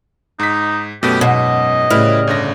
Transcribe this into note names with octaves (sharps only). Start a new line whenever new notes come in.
G#2 D#4 B6
F#2 B2 A3 B3 G4
G#2 B2 D#5
A2 C#3 G3 E4 B4 F6
G1 D3 A#6